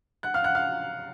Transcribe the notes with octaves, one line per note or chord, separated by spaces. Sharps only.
F#5 F#6
F5 F6
F#5 F#6
F5 F6